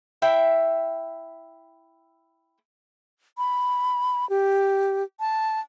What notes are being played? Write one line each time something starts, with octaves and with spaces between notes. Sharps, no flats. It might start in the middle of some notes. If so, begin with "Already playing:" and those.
E4 E5 G5
B5
G4
A5